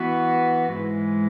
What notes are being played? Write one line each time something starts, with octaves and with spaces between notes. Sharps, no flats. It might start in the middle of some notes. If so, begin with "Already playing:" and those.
Already playing: E3 B3 F#4 B4
G#2 E3 G#3